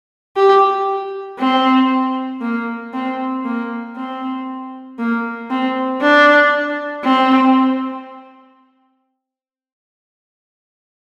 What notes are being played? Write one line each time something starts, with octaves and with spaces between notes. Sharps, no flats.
G4
C4
A#3
C4
A#3
C4
A#3
C4
D4
C4